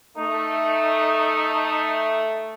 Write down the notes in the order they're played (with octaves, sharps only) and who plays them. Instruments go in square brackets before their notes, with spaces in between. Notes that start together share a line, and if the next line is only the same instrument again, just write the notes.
[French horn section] A3 [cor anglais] D#4